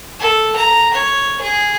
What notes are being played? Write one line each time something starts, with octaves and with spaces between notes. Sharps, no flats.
A4
A#5
C#5
G#4